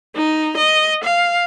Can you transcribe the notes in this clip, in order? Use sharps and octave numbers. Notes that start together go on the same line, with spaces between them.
D#4
D#5
F5